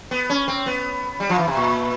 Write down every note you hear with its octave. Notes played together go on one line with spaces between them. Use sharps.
B3
C#4
C4
B3
G3
F3
E3
C3
A#2